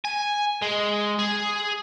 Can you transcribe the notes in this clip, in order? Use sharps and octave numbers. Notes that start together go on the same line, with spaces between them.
G#5
G#3
G#4